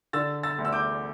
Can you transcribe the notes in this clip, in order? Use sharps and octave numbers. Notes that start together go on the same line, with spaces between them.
D3 E6 A6
E6 A6
D2
E6
D6 G6